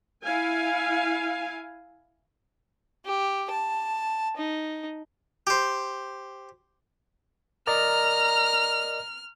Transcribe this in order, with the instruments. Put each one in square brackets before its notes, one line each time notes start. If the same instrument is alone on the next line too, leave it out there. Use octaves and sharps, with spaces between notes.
[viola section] E4 F5 G#5
[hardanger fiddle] G4
A5
D#4
[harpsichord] G4 C5
[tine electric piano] A#4 D5 D#5 [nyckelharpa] A#5 [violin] F6